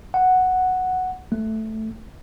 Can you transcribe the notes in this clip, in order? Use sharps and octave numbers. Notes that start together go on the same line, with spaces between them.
F#5
A3